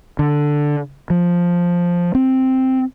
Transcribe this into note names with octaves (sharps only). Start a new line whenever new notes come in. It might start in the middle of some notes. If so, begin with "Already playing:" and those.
D3
F3
C4